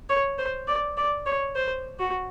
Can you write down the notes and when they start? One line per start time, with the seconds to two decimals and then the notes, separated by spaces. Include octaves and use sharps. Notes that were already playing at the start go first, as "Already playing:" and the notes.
0.09 C#5
0.39 C5
0.68 D5
0.97 D5
1.26 C#5
1.56 C5
1.99 F#4